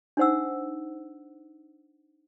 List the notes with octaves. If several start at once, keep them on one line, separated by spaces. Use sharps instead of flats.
D4 D#4 C5 F#5 E6